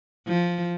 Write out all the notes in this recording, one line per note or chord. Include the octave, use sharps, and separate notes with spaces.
F3